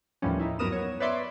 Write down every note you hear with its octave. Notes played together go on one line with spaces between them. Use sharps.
D#2 A2 E3 F3 G3 C#4
D#4 E4
G2 F#3 B3 A#4 D#6 E7
B3 C#5
B4 C#5 D5 E5 C6 D6